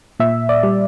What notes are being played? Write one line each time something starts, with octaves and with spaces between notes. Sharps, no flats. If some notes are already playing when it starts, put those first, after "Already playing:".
A#2 E5
D5
G3